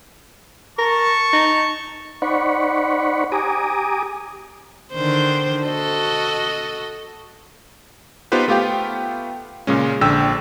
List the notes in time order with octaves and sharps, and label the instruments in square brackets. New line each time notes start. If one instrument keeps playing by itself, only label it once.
[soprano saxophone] A#4 [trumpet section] A5 C#6
[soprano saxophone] D#4
[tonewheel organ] D#4 C5 D5 F#5 B5 C#6
G4 G#5 A#5 D6 D#6
[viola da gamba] D3 D#3 C5
F#4 A4 D#5
[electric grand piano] B3 D#4 F4 G4 B4 C5
A3 B3 F4 G4 F5 G5
A#2 C#3 G#3 C#4
A#1 D3 G5 E6